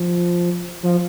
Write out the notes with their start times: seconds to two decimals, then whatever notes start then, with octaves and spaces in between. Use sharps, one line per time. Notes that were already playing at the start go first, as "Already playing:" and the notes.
Already playing: F3
0.83 F3